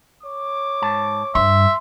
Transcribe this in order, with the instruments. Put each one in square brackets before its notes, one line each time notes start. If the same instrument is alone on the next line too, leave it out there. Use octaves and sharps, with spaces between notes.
[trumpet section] C#5 D6
[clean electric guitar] G#2 A5
[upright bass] G2 [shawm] E5 [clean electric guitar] C6